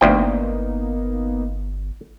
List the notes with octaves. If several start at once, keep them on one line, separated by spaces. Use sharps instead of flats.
G1 D2 F3 A#3 B3 D#4 G5